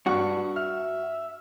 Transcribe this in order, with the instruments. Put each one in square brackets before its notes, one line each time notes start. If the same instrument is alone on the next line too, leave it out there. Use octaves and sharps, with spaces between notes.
[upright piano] G2 C#6 [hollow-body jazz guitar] F#4
[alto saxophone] E5 [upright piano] F6